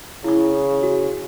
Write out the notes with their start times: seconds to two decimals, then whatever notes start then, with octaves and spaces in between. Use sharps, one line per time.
0.24 C#3 E4 C#6
0.83 F#4